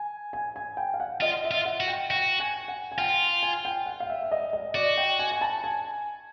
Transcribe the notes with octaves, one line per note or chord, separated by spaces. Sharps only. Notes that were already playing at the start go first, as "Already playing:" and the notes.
Already playing: G#5
G#5
G#5
G5
F5
F#5
F4 D#5
E5
F4
F#5
F#4
G5
F#4 G5
G#5
F#5
G#5
F4 G5
G#5
G5
F#5
F5
E5
E5
D#5
D#5
F#4 D5
G5
G#5
G#5
A5
G#5